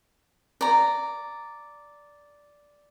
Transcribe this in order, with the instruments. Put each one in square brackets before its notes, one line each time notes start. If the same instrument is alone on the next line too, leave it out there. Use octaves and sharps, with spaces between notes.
[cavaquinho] D5 A#5